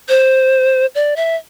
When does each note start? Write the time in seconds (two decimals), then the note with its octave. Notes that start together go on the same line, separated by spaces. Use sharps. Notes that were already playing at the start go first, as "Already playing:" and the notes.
0.09 C5
0.95 D5
1.16 E5